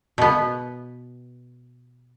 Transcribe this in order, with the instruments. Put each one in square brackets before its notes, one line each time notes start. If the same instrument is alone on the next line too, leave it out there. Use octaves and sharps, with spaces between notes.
[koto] B2 B3